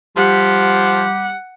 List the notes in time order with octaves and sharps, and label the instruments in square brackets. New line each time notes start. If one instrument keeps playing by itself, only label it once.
[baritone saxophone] F3 [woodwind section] G3 G4 [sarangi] F#5